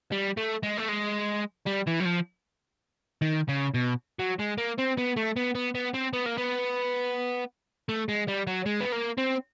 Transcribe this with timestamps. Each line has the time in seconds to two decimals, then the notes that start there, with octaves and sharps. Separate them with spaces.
0.12 G3
0.37 A3
0.63 G#3
0.77 A3
0.89 G#3
1.66 G3
1.87 E3
2.00 F#3
2.05 F3
3.22 D#3
3.49 C#3
3.74 B2
4.19 F#3
4.39 G#3
4.58 A#3
4.78 C4
4.97 B3
5.16 A3
5.36 B3
5.55 B3
5.75 B3
5.94 C4
6.13 B3
6.26 A#3
6.37 B3
7.89 A3
8.09 G#3
8.28 G3
8.47 F#3
8.66 G#3
8.80 B3
8.92 A#3
9.18 C4